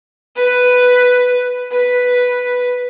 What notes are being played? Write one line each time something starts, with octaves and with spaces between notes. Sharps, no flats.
B4
B4